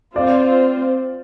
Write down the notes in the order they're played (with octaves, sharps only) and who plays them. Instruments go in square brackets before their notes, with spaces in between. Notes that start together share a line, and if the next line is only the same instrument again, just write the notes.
[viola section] C4 F4 C5 [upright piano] D5 F5